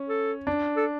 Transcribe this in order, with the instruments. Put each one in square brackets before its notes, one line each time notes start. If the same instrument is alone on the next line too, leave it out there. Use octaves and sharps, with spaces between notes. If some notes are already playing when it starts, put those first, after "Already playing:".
Already playing: [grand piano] C#4
[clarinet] A4
[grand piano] D4
[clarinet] A4